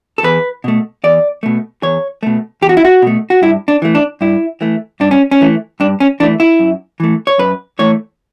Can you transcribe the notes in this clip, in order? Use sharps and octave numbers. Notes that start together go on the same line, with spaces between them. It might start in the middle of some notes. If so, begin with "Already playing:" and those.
A4
E2 B4
B2 A3
E2 D5
B2 A3
E2 C#5
B2 A3
E2 G4
F#4
E4
F#4
B2 A3
F#4
G2 E4
D4
E3 A3
D4
G2 E4
E3 A3
G2 D4
C#4
C#4
E3 A3
G2 D4
C#4
E3 A3 D4
E4
F#2
E3 A3
C#5
F#2 B4
E3 A3 C#5